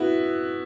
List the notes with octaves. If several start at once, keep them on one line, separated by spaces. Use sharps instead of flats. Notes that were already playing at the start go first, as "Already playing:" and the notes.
Already playing: B3 E4 F#4